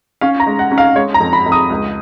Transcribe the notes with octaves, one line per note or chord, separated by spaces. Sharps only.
C#4 F5
A#5
G#3
F#5
C#4
F5
G#3 C#5
A#5
F2
B5
F2
D#6
C#2